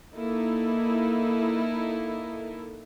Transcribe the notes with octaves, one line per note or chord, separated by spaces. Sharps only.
A#3 D#4 E4 A4